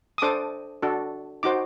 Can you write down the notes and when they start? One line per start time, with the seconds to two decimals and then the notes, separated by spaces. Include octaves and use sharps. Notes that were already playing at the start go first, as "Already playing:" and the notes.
0.18 D#6
0.22 D4 A4 C5 D6
0.82 D4 F#4 A4
1.43 D#4 F#4 C5 D6